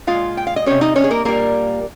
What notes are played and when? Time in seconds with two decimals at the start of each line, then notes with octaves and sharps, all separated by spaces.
0.07 A#2 G#3 F4 F5
0.37 G5
0.47 F5
0.56 D#5
0.66 C3 G3 C#4 C#5
0.81 D#4 D#5
0.96 C#4 C#5
1.04 G#4
1.11 A#3 A#4
1.25 A#2 G3 A#3 A#4